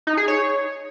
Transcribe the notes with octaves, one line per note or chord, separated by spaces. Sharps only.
D#4
G#4
C#5